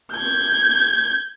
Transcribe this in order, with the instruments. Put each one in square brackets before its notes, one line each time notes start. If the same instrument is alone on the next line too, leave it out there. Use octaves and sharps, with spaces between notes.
[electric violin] G6 G#6